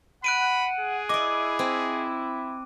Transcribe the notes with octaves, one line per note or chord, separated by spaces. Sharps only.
F#5 B5 F#6 D7 D#7
G#4
E4 D5 D#5 D6
C4